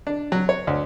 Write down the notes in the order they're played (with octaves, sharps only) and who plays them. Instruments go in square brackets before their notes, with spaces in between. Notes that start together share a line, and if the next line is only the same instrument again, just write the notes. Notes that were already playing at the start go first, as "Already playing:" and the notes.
[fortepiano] D4
F#3
C#5
D2